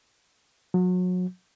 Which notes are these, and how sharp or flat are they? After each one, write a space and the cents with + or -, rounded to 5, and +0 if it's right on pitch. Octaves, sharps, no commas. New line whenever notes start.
F#3 -30